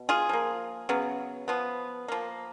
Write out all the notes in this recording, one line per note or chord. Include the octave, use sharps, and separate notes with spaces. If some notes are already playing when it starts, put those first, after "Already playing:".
Already playing: B2
F4 G#4
F3 A#3
C#3 F#3 B3
F3 B3
F3 A#3